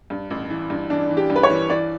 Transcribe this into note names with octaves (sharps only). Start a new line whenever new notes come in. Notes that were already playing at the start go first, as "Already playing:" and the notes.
G2
A1
E3
G2
E3 D4
E3
G4
G2
B4
C#5
E3
E3 D5